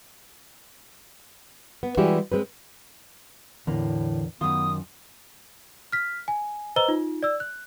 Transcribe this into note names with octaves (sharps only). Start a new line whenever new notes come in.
B3
E3 G3 G#3 E4 F#4 G4
G#3 C4 B4
E2 A2 D3 A#3
F#2 D#3 B3 F4 D#6
F6 B6
G#5
B4 C5 D#5 A#5 E6 G7
D#4 F4
D5 E6
F#6